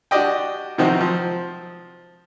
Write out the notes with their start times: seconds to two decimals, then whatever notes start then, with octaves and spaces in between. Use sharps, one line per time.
0.11 D4 F#4 G4 D5 D#5 G5
0.78 C3 D#3 F3 C4 D#4 F#4
1.00 F3